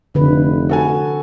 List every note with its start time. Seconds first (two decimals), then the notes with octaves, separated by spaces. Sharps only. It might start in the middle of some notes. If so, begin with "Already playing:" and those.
0.15 F1 D3 B4
0.69 F#4 A4 G#5